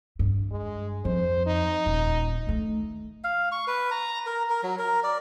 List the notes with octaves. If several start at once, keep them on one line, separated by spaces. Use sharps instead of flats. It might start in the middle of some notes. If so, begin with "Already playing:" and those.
G2
G#3
F2 C5
D#4
D#1
D#3 A3
F5
C#6
B4
A#5
A#4
A#4
F#3
A#4
D5